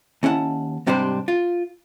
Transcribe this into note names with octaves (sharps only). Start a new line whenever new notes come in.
D#2 C#4 E4 F#5 A5
G#2 C3 G3 D4 G4 C5
F4